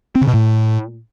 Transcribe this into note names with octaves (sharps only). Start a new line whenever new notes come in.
C4
C#3
B2
A2